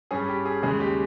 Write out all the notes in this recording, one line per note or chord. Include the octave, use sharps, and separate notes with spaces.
G2 G3 C#4 G#4
G4
G#4
D#2 C#3 G#3 G#4
G4